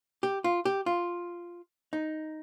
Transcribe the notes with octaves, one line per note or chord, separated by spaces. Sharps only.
G4
F4
G4
F4
D#4